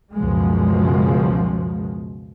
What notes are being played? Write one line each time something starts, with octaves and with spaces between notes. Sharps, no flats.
C#2 F#2 B2 F3 G#3